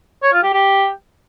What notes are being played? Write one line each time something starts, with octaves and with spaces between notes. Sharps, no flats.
C#5
F4
G4
G4